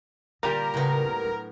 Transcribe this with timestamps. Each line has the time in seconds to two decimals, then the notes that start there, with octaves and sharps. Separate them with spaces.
0.43 A#2 D3 G3 G4 A#4
0.74 A2 C#3 B3
1.04 C4
1.25 F#3 D4